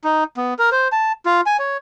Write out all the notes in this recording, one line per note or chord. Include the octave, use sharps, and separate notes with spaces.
D#4
B3
A#4
C5
A5
F4
G#5
C#5